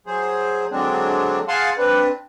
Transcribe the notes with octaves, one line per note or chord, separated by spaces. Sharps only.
F#3 G#4 C5
D3 F#3 G#3 C4 D4
G#4 F5 F#5 G#5 A5 C6
C4 D4 B4